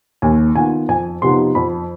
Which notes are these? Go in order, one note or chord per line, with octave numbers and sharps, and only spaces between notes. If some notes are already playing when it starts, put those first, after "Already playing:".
D#2 G#5
D#3 B3 F4 G#5
F2 G#5
C3 F3 B3 D#4 C6
F2 B5